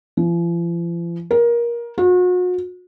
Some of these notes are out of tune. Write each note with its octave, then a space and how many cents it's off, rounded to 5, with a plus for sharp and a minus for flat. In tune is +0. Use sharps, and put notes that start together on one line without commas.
F3 -45
A#4 +20
F#4 -40